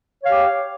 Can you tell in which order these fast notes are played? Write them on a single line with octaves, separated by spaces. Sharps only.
C#5 F5 G4